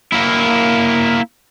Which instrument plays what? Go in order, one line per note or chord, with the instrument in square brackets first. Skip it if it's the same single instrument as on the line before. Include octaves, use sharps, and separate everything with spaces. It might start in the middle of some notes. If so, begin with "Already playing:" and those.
[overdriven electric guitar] A#3 E4